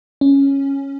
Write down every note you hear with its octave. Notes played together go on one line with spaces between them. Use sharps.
C#4